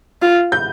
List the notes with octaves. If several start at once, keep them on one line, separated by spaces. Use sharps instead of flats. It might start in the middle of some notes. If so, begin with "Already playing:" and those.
F4
G6